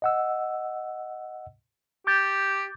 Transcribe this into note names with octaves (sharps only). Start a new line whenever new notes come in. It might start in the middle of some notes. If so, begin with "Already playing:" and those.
D#5 F#5 E6
G4 D6 G6 A6